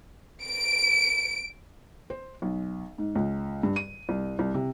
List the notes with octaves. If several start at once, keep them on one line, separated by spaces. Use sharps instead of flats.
D7
C5
B1
G#2
C#2
G2
D#7
C2
C2
C3